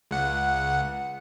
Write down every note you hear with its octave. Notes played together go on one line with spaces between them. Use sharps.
C#2 F#5